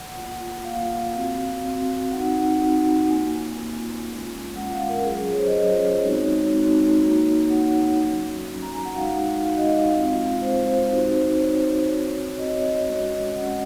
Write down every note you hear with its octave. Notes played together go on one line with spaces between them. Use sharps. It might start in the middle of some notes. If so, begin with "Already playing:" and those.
Already playing: F#5
A#3 F4
A#3 F4 F5
C4 F#4
C4 F#4
C4 D#4 F#4 F#5
C4 D#4 F#4
A#3 F4 G#5
A#3 F4
G#3 C#4 F4
G#3 C#4 F4 F#5
F5
A#4
F#3 C#4 F4 G#4
G#4
C#5
C5
D#5
F#3 C#4 F4 C#5
G#3 C4 D#4 F#4
G#3 C4 D#4 F#4
A#3 D#4 F#4
A#3 D#4 F#4 F#5
F#3 C#4 F#4
F#3 C#4 F#4
A#5
G#5
F#5
G#3 D#4 F#4 F5
G#3 D#4 F#4 F5
D#5
F5
G#3 C4 F4
G#3 C4 F4 C5
C4 D#4 F#4
C4 D#4 F#4 C#5
C4 F#4
C4 F#4 D#5
C#5
D#5
G#3 C#4 F#4
G#3 C#4 F#4 F#5